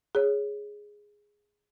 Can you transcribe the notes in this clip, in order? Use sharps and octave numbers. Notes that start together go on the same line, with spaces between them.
G#4 C#5